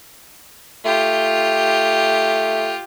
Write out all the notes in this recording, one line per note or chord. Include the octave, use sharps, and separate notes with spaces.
A3 F4 G4